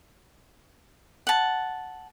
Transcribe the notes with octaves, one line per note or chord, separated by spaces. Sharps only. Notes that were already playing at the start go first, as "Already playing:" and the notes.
F#5 A5